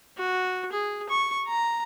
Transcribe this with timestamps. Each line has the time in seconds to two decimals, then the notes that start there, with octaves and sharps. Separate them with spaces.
0.18 F#4
0.72 G#4
1.09 C#6
1.48 A#5